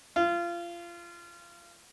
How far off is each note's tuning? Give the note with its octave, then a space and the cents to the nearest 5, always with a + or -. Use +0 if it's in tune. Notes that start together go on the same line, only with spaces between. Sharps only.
F4 -25